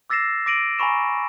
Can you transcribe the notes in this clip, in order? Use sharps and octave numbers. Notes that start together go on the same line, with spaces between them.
D6 E6 A6 A#6 C7 E7
D6 A#6 D7 D#7 F#7
G#5 A#5 B5 C#6 E7